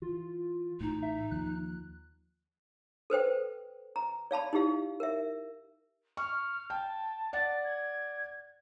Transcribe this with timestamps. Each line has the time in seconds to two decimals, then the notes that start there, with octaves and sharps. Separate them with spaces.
0.02 E3 F4
0.81 A1 A2 D#4
1.02 E5
1.31 D#2 F3 F#6
3.10 A4 B4 C5 G5
3.96 A#5
4.31 D5 F5 A5 B5
4.53 D#4 E4 G4 F5
5.00 A#4 E5
6.17 C#6 F6
6.70 G5 A5
7.33 D5 F#5 A6
7.64 G#6